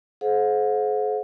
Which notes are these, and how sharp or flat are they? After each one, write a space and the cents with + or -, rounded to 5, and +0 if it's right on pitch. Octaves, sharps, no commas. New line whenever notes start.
G#4 +45 C5 +0 F#5 -45